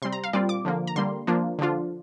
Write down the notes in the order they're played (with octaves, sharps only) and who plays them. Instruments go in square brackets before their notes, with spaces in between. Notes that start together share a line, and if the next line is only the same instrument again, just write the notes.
[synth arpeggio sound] C3 G3 C4 C6
A#5
F5
A#2 G3 C4 F4 D5
D6
D3 F3 A#3
A#5
D3 G3 A#3 C6
F3 A#3 D4 F4
D3 F3 D4 F4